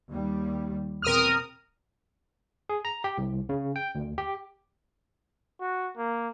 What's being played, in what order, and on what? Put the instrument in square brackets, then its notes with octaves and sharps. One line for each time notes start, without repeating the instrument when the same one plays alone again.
[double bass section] D#2 G3
[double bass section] E2 B2 C4 [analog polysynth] A#4 D#6 F6
[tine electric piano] G#4
A#5
G4
C2
C#3
G5
D2
G4
[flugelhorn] F#4
A#3